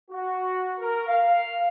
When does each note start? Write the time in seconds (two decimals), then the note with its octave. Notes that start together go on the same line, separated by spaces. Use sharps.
0.10 F#4
0.79 A#4
1.07 F5